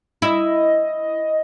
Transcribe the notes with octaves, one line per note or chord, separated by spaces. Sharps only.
E4 D#5